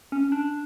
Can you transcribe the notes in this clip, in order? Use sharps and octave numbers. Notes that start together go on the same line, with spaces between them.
C#4
D4